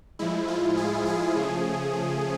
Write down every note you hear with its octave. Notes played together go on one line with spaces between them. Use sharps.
A2 F3 G#3 E4
F4
G#4
G#4
C#3 F3 A3